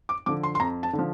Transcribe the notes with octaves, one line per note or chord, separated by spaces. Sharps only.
D6
D3 F3 D6
C6
C6
F2 A#5
A5
D3
F3